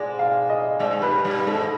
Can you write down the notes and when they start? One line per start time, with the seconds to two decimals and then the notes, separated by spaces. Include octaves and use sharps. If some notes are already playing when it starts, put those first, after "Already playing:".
Already playing: G#2 G#3 D5
0.19 F5
0.50 D#5
0.79 G#2 G#3 D5
0.91 G#3
1.02 G2 G3 B4
1.25 G2 G3
1.46 G#2 G#3 A4